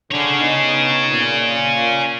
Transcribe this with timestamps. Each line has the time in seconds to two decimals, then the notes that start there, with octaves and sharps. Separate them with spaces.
0.11 D3 G#4 C#5
0.41 B3 D#4
1.09 A#2